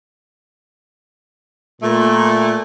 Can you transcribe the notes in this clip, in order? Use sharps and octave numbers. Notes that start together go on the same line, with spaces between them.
A#2 A3